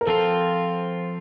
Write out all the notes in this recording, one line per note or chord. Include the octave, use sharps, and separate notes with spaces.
A#4
F3 C4 F4 A4